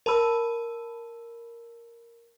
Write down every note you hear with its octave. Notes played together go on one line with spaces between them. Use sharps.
A#4 A5 B5 E6